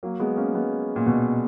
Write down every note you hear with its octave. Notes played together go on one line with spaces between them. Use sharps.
F#3 A#3
G#3 B3
A#3 C#4
G#3 B3
A#2
B2